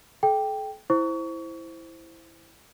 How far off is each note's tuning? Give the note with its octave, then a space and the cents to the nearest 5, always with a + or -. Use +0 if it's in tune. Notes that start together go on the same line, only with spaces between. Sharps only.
A4 -45 G5 +0
E4 +0 C5 +0 C#6 +30